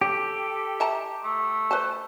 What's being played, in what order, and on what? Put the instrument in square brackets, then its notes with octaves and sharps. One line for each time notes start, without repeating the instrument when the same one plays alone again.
[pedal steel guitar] G4 [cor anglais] A4 [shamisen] C#5
[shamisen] E5 A5 A#5
[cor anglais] A3
[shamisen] B4 C5 A5